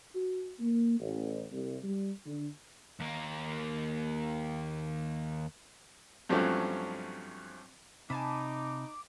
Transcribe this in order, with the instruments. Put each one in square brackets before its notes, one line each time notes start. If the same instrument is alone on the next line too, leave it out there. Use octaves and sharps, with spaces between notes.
[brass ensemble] F#4
A#3
A1
C2
G3
D3
[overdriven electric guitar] D#2 A#3
[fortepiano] G2 F3 F#3 A3 C4 C#4
[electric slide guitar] C3 [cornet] D#4 [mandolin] G#5 A5 B5 [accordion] D6